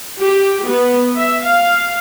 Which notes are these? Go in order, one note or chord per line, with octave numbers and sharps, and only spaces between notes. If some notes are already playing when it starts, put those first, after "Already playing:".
G4
B3
E5
F5